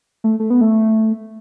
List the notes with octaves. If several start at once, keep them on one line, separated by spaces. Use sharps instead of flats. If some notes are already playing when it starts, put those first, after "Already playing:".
A3
A3
B3
A3